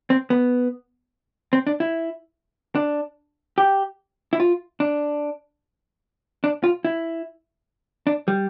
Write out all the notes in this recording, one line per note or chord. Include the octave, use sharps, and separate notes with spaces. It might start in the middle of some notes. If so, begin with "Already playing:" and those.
C4
B3
C4
D4
E4
D4
G4
E4
F4
D4
D4
F4
E4
D4
G3